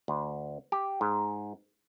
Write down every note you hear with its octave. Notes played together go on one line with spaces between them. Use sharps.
D2
G4
G#2